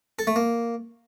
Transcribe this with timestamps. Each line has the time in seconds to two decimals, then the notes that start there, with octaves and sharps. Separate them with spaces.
0.19 A4
0.27 A3
0.36 A#3